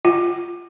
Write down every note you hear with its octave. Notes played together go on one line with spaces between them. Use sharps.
F4